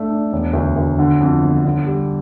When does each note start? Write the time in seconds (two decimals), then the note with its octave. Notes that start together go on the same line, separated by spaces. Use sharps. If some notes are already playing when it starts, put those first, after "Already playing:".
Already playing: A3 D4
0.10 D4
0.32 E1
0.53 D2
0.76 D2
0.99 D3
1.21 F2
1.42 G1
1.65 D3
1.86 G3